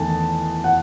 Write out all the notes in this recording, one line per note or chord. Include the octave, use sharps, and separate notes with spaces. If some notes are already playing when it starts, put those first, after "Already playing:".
Already playing: E2 D#3 A3 A5
F#5